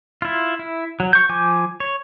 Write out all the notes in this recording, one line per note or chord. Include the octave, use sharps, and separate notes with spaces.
E4 F4
E4
F#3
C#6 G6
F3 G#5 D6 G6
C#5